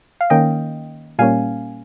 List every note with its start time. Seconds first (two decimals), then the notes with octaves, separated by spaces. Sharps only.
0.21 F5
0.30 D#3 A#3 C#4 D#5 G5
1.19 A#2 G3 A#3 C#4 F5 G#5